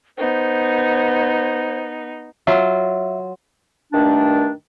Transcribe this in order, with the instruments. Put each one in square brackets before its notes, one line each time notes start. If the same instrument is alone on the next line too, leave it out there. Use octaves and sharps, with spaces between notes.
[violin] B3 D#4 [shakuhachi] C5
[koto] F#3 F4 [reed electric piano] E5
[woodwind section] G2 A#2 D#3 A3 D4